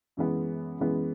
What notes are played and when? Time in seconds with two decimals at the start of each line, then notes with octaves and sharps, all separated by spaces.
0.17 F#2 E3 G#3 B3
0.79 F#2 E3 G#3 B3